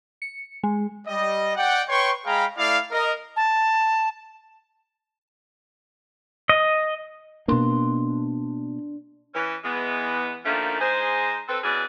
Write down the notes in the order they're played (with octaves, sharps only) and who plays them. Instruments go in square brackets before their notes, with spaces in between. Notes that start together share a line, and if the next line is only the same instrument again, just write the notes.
[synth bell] C#7
G#3
[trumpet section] G3 D#5
D5 F#5 G5
B4 C#5 G5 C6 C#6
G#3 G#4 F5 G5 A#5 B5
A3 E4 D5 F5
A#4 D#5
[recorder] A5
[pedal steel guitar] D#5
[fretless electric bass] B2 A#3 [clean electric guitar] D4 C6
[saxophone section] E3 C#4 B4
E3 G#3 B3
F#2 D#3 F3 A3 A#3 D4
G#3 D#4 G#4 C5
C4 A4 B4
B2 E3 C#4 G#4 B4 D5